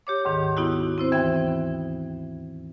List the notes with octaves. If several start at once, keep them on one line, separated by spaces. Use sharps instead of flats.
G4 C#5 D6
D2 G#2 D#3
B3 D#4 E4 F#4
C4 E4 C5
D#2 E3 B3 E5 G5